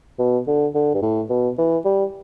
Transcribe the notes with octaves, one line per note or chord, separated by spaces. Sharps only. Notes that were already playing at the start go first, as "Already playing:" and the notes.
B2
D3
D3
G2
A2
B2
E3
G3